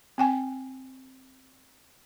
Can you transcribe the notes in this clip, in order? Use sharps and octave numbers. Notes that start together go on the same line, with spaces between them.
C4 G5 G#5